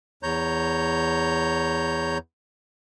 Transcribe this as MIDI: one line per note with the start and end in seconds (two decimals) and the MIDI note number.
0.23 2.18 40
0.23 2.18 73
0.23 2.18 82
0.23 2.18 91